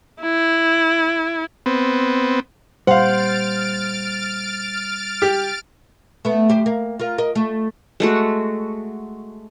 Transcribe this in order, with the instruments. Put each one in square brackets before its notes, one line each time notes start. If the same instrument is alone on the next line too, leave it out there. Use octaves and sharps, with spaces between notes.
[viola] E4
[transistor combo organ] B3 C4
[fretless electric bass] A#2 G3 [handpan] C5 [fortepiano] F5 F#5 [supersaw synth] F6 A6 D7
[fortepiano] G4
[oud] A3 B3
F#2 G4 C5
A#3
F4 A#4
A#4 D#5
A3
[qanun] G#3 A3 F#4